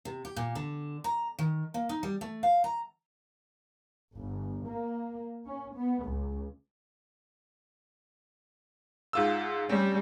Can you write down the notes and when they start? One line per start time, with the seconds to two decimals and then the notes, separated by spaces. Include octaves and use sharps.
0.05 C3
0.25 G4
0.36 A#2
0.55 D3
1.04 A#5
1.39 D#3
1.74 A#3
1.89 D#4
2.03 G3
2.21 A3
2.43 F5
2.64 A#5
4.14 G1
4.66 A#3
5.45 C#4
5.74 B3
6.04 C#2
9.13 G#2 F4 E6
9.69 G3 C4 C#4